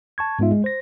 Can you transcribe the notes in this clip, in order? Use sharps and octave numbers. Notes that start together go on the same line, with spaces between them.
A5 C#6 G#6
G#2 G#3 B3 D#4 F4 E5
G#3
C5 A#6